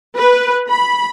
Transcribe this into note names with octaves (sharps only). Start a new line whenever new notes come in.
B4
B5